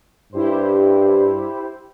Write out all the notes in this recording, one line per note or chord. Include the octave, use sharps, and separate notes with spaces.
G2 E4 G4 C5